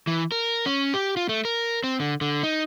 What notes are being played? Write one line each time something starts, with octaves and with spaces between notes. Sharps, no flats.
E3
A#4
C#4
G4
F4
A3
A#4
C4
D3
D3
D#4